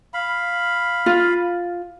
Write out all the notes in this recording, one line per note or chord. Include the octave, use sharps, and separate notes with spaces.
F5 B5
F4